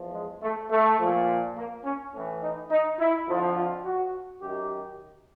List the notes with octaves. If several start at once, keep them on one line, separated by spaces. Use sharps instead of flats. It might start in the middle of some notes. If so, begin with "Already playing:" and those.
Already playing: E2 F3
G#3
A3
A3
A#2 F3
A#3
C#4
A2 E3 C#4
D#4
D#4
E4
F2 D3 F3
F4
F#4
F#2 D#3 G4